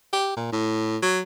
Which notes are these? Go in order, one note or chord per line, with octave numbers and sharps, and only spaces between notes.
G4
A#2
A2
F#3